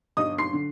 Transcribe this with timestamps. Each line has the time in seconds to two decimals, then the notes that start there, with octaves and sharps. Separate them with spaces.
0.17 G1 D#5 D#6
0.38 C6 C7
0.53 D3